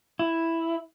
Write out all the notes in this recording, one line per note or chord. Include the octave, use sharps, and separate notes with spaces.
E4